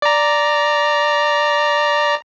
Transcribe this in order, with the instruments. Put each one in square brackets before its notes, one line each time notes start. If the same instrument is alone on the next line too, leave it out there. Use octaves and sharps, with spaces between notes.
[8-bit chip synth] D5 A#5